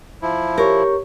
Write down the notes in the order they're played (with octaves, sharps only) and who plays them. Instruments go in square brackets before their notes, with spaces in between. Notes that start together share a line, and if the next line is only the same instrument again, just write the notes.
[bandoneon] F3 E4
[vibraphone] G4 C#5 C#6 [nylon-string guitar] A#4